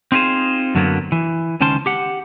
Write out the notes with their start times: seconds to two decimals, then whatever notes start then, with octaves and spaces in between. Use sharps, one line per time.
0.12 C4 D#4 F4 G4 G#4 C5
0.75 F#2 D3 F#3 A#3 B3
1.12 E3
1.61 C#2 D#3 C#4 C5 A5 C6
1.86 G4 F#5